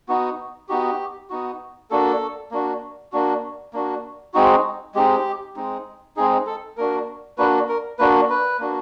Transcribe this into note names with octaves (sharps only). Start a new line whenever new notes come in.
B3 D#4 F#4
B3 D#4 F#4 G4
B3 D#4 F#4
A#3 D4 F#4 A4
A#3 D4 F#4
A#3 D4 F#4
A#3 D4 F#4
G#3 C4 D#4 F#4
G#3 C4 D#4 G4
G#3 C4 D#4
G#3 C4 D#4 G#4
A4
A#3 D4 F#4 A#4
A#3 D4 F#4 B4
A#4
A#3 D4 F#4 B4
B4
A#3 D4 F#4